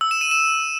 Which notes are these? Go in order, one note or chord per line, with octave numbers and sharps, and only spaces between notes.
E6
E7
D#7
E7